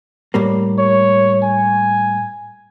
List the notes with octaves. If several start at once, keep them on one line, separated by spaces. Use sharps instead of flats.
A2 G3 A#3
C#5
G#5